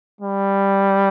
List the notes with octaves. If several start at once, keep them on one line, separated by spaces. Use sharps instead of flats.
G3